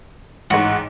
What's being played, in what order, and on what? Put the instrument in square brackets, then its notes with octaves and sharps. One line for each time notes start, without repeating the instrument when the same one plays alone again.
[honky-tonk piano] A1 G#2 [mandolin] F#4